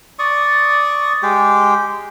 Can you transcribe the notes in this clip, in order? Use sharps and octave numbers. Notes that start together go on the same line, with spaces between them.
D5 C#6 D#6
G#3 G4